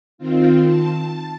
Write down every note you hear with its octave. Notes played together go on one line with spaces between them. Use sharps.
D#3 C4 F4
A5